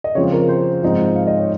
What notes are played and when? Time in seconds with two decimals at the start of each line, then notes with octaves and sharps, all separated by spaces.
0.04 D#5
0.15 C#3 F3 C4 C#5
0.33 A#4
0.48 C5
0.83 G#2 F3 C4 D#4
1.16 F5
1.27 D#5
1.39 C#5